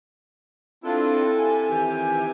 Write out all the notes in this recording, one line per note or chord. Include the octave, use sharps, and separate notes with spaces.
C4 D4 E4 F4 A4
C3 G#5
D#3 E3 G4